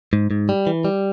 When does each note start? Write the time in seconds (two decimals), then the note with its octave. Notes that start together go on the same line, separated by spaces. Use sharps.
0.13 G#2
0.31 G#2
0.49 G3
0.67 E3
0.85 G3